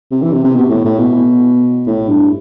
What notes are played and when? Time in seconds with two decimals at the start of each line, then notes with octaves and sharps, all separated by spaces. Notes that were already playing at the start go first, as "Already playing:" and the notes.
0.11 C3
0.22 E3
0.33 C3
0.44 C3
0.56 B2
0.69 A2
0.85 A2
0.99 B2
1.87 A2
2.09 G2